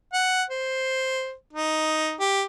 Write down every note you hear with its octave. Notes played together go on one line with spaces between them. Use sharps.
F#5
C5
D#4
G4